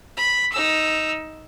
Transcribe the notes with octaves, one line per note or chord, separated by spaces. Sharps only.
B5
D#4 E6